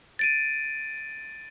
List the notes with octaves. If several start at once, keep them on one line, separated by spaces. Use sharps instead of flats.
A6 D7 D#7